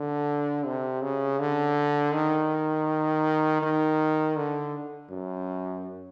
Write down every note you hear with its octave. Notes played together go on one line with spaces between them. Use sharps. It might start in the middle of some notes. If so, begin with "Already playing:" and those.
Already playing: D3
C3
C#3
D3
D#3
D#3
D3
F#2